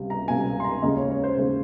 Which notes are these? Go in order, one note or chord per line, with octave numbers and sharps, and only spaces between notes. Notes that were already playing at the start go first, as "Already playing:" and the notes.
Already playing: C#2 C3 G3
A#5
C#2 C3 G3 G#5
C6
A#5
D#2 C#3 G#3 D#5
C#5
C#5
C5
D#2 C#3 G#3